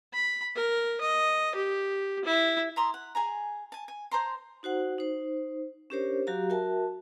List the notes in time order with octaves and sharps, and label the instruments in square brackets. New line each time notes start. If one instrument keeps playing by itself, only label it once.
[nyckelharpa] B5
A#4
D#5
G4
E4
[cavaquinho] E5 A#5 C6 D#6
F#5
G#4 G#5 A#5
G#5 A5
G#5
C5 A5 A#5 C6
[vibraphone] D#4 F#4 C5 F#5
D#4 C5
C#4 D4 G4 A#4 C5 C#5
F#3 F#4 G4 F5 A#5
F#4 A#4 E5 G5 A5